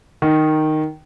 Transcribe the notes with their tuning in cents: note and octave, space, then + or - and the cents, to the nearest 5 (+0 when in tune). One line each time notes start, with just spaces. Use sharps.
D#3 -5